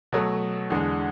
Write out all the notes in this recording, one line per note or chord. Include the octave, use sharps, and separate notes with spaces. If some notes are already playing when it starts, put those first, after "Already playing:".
B2 F#3 A3
E2 D3 G#3